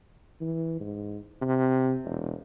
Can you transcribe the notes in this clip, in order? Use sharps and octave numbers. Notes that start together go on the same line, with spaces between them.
E3
G#2
C3
E1